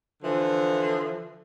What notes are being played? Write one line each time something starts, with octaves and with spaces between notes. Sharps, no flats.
D3 E3 F3